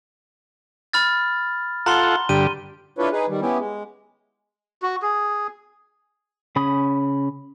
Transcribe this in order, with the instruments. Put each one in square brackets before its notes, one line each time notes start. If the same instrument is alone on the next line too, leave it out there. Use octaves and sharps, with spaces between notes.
[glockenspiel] B5 F6 A6
[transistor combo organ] F4 A4 F#5 [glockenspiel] A#5 C6 G7
[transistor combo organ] G2 D3 G4 [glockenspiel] D#7
[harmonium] D4 E4 F4 A4 B4 C#5
D#4 G#4 B4
D#3 G3
B3 C#4 E4 G4
G#3
[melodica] F#4
G#4
[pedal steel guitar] C#3 C#4 B5 D#6